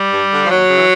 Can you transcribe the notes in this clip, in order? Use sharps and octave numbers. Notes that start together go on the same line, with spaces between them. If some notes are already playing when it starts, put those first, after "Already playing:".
Already playing: G3
G2
D3
F3
D#2 F#3
C#3 E3